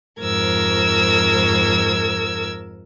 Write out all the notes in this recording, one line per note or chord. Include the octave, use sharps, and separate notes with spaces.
F2 G#2 A#4 E6 G#6